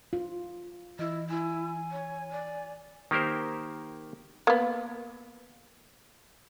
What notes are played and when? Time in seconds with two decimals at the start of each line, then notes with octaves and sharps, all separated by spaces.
0.13 F4
0.99 E3 E4 D#5
1.29 E4 G#5
1.92 C#5
2.31 D5
3.11 D#3 A#3 G4 A#4 C5
4.47 A#3 B3